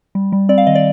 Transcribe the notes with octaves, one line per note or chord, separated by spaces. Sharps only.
G3
G3
C4 D5
F5
D#3 D#5
D5